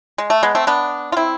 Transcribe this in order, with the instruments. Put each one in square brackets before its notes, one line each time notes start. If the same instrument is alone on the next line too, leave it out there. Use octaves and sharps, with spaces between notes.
[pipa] G#3
A3
G#3 B3
A3 C4
B3 D4
F4
C4 E4